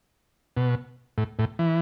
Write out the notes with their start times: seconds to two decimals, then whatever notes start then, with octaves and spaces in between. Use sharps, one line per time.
0.57 B2
1.18 A2
1.39 A2
1.59 E3